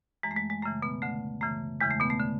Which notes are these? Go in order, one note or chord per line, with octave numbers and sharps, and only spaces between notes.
F#2 E3 G#3
A3
G#3
G#3
F#2 C#3 E3 A3
B2 B3
D2 D3 A3
F#2 C#3 E3 A3
E2 C#3 E3 G#3
A3
B2 B3
A3
D3